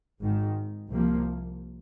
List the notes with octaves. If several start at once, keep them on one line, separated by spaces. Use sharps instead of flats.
G#1 G#2 D#3
C2 C3 F3 A#3